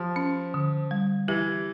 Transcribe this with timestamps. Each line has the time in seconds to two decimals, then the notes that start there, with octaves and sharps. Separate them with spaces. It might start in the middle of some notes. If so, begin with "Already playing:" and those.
Already playing: F3 G4
0.16 C#4
0.54 D3
0.91 G3
1.28 E3 G4